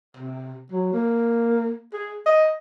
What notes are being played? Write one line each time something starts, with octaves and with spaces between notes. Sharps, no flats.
C3
F#3
A#3
G#4
D#5